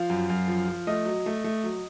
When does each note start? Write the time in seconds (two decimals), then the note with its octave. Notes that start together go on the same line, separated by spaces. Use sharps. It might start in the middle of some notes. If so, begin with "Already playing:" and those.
Already playing: F3 F5
0.10 F#2
0.30 F#2
0.48 F3
0.68 F3
0.87 A3 D#5
1.06 F#3
1.26 A3
1.44 A3
1.64 F#3